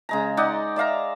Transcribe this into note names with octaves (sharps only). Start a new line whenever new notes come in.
C#3 G#3 A#5
D#4 D5 D#5 F#5
D5 E5 F5 A#5